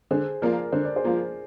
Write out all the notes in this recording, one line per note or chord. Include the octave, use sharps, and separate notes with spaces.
D3 G#4 C5
F3 A#3 F4 A#4 D5
D3 C5
D5
G#4 C5
F3 A#3 F4